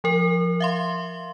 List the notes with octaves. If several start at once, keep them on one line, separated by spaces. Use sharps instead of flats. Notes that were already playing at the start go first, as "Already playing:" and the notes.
F3 A#4
E5 F5 C6